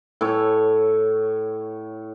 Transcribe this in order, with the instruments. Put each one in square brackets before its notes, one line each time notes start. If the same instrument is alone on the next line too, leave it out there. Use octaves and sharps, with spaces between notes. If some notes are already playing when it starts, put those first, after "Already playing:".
[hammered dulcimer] A2 C#5